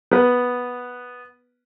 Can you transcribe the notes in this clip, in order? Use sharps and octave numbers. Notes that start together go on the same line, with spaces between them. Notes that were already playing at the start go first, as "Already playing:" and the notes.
B3 B4